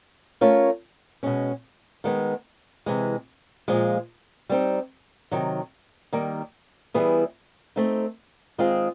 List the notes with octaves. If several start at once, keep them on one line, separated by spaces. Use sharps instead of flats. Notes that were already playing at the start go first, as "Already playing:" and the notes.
A3 C#4 F4 A#4 C#5
B2 G#3 C#4
D#3 G#3 B3
C3 E3 G#3
A#2 F3 G#3
G3 C4 D#4
C3 D#3 F#3
D#3 G3 A#3
E3 G3 B3 E4 G#4
A3 C4 D#4
D#3 G#3 C4 F4 G#4